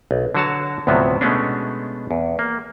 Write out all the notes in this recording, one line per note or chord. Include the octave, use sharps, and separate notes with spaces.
B1
D3 F#3 F#4 C#5 A5
D2 A2 C3 F3 F#3 B3
B2 G#3 A3 B3 C#4 D4
E2
A#3